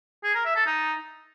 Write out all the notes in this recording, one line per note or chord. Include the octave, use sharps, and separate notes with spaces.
G#4
A#4
E5
A4
D#4